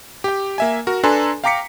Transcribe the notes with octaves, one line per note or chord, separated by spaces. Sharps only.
G4 G5
A#3 E5 G#5
F#4 A#4
D4 A4 B4 G#5 A#5 C6
F5 G5 A#5 D6 B6 C#7